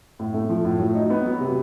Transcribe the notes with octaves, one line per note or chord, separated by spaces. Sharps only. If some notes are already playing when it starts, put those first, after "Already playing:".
A2
A3
F3
A2
F#3
D#4
B3
F#3
C3